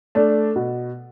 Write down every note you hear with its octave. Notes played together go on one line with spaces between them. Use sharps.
A3 D4
B2